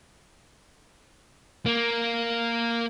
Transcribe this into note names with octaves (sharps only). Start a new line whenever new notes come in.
A#3